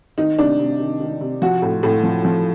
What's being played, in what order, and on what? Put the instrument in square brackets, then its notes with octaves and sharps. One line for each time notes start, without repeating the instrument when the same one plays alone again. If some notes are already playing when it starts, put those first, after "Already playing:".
[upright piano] D#3 D#4
C3 D4
C3
D#3
D#3
C3
F3 F#4
A2
A2
F3
F3